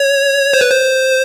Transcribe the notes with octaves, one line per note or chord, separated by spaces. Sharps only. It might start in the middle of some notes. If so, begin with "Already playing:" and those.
Already playing: C#5
C5
B4
C5